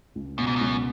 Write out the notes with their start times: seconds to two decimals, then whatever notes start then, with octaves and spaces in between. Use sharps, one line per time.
0.15 C#2
0.38 F#2 B2
0.47 G#2
0.56 C#2 F#2